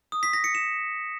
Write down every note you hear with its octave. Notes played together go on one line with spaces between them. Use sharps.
D#6
B6
A#6
C#7
E7